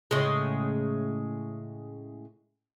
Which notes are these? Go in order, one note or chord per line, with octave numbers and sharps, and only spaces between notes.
A2 C#3 G#3